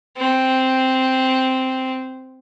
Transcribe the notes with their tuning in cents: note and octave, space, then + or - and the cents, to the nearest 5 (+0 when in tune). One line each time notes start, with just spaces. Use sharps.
C4 -5